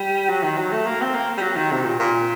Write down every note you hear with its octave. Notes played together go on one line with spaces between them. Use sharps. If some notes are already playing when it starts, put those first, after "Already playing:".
Already playing: G3
F#3
D#3
F#3
A3
A#3
C4
A#3
G3
F#3
D#3
C3
A#2
A#2